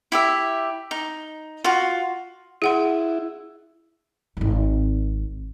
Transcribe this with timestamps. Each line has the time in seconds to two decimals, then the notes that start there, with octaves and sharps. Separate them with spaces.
0.12 E4 G4 E5
0.91 D#4
1.64 F4 F#4
2.62 E4 G#4 F#5 C6
4.37 D1 G#1